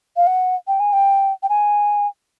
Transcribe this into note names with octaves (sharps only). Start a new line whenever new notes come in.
F5
F#5
G5
G#5
G5
G5
G#5